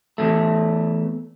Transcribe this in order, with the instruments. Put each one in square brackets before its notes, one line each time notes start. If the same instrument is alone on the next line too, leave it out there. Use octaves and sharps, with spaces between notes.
[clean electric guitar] E2 G#2 A3